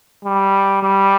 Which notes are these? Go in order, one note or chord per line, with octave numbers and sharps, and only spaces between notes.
G3
G3